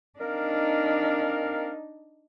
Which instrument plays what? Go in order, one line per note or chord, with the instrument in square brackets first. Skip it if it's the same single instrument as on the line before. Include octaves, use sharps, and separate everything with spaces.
[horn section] C4 A#4 F5 [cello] D4 D#4